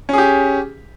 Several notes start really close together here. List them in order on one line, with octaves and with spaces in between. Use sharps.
C#4 G#4 G4